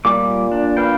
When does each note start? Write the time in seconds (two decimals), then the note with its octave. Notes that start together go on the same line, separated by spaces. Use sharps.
0.05 A#2 G3 D6
0.52 D4
0.77 D4 B4 F5 G5